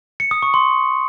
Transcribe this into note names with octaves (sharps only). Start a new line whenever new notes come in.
C#7
D#6
C#6
C6